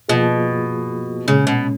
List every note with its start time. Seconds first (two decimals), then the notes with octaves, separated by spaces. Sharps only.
0.09 B2 F3 A#3 F4 G#4
1.28 A#2 C#3 G#3 C#4
1.47 B2